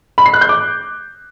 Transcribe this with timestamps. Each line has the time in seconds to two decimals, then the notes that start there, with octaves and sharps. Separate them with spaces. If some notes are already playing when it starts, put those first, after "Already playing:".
0.18 B5
0.26 C7
0.34 F#6
0.41 G6
0.49 D6